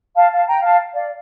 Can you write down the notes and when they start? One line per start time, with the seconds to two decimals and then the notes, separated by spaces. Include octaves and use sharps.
0.15 F5 A5
0.31 F5 A5
0.47 G5 A#5
0.62 F5 A5
0.94 D5 F5